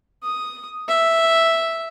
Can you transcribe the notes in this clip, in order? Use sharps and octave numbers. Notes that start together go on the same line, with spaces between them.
D#6
E5